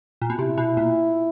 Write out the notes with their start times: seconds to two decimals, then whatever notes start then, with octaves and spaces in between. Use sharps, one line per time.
0.22 A#2
0.30 B2
0.38 C3 E4
0.58 B2
0.77 A#2